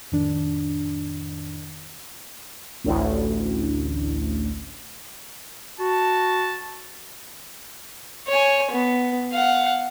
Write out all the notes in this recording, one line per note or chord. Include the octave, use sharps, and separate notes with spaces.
F2 A2 D#3 D4
A1 D2 A2
F#4 A5
C#5 G#5
B3
F5 F#5